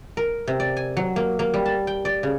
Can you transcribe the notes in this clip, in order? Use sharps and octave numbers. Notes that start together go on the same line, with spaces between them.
A#4
C3
D5
G#5
F#3
A#3
A#3
G3
A5
G5
D5
C#3